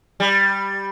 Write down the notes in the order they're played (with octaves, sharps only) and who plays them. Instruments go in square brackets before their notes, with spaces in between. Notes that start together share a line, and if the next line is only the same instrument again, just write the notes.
[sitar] G3